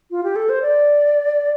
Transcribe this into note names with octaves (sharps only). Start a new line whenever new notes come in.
F4
G4
A4
C5
D5